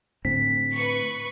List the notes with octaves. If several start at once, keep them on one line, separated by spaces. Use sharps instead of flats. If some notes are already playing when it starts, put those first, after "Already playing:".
A2 D3 C4 B6
B4 C#6